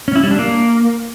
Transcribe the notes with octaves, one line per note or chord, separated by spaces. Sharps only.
C#4
E4
G3
D4
A#3